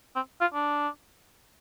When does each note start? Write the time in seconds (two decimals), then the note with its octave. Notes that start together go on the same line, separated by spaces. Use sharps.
0.15 C4
0.41 F4
0.54 D4